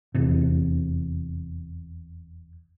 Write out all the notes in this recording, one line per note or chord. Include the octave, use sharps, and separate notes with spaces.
F1 E2 C3